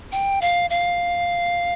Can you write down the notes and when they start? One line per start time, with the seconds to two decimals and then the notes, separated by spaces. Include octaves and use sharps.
0.12 G5
0.41 F5
0.70 F5